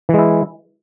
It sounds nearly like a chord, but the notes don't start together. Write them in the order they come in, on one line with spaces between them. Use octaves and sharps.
E3 G#3 E4